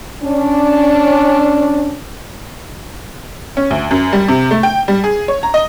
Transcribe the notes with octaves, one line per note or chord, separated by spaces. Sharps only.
C#4 D4
C#4
D2
F#2
G3
C3
A3
G5
G3
G#4
C#5
A#5
D#5